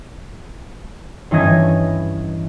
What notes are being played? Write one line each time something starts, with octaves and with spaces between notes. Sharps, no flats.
G2 E3 C#4 D#5 G#6